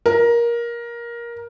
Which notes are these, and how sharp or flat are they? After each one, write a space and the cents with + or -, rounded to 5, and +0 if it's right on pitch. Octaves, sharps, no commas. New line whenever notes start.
A#4 +15